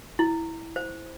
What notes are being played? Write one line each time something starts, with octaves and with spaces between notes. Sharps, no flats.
E4
C5